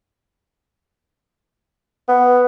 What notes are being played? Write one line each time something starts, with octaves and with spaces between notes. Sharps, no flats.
B3